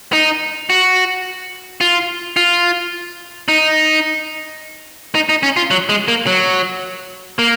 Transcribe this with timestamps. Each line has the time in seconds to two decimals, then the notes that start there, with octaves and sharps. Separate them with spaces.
0.13 D#4
0.70 F#4
1.81 F4
2.37 F4
3.48 D#4
5.15 D#4
5.29 D#4
5.43 C#4
5.57 F4
5.71 F#3
5.89 G#3
6.08 A#3
6.27 F#3
7.39 A#3